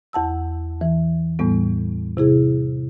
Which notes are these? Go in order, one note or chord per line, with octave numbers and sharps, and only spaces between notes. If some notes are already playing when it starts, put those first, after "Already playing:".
E2 F#5 A5 E6
E3
E2 A2 G3 B3
C3 E4 G#4